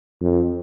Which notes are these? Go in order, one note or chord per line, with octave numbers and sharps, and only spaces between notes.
F2